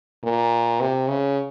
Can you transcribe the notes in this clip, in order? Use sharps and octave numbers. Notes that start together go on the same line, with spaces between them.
A#2
C3
C#3